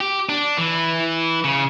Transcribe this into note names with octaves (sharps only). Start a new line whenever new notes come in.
G4
D4
E3
C#3